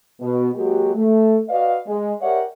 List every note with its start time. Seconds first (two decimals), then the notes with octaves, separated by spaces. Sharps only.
0.21 B2
0.55 F#3 G#3 A#3 F#4 G4
0.95 A3
1.49 F#4 B4 D5 D#5 F5
1.87 G#3
2.21 G4 A#4 C#5 D5 E5 F#5